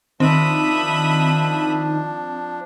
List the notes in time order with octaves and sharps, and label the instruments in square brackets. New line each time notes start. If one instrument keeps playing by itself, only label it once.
[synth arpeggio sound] D#3 [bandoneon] F3 D4 [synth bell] C4 [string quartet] E5 B5 D#6